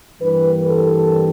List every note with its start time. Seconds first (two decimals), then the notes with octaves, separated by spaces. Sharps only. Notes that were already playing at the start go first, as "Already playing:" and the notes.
0.18 G2 E3 G3 A#3 B4
0.67 A4